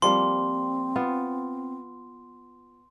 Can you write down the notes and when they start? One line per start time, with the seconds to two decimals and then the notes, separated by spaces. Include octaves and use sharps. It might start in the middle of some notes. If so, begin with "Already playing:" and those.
0.02 F3 G3 A#3 C4 C6
0.96 B3 F4